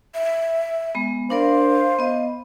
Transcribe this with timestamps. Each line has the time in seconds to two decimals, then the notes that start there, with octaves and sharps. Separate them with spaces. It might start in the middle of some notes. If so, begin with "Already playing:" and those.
0.15 E5
0.95 G#3 B3
1.30 D4 A#4 C5 D5 F5
1.99 B3 D#5